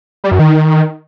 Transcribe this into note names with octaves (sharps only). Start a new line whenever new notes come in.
G3
F#2
D#3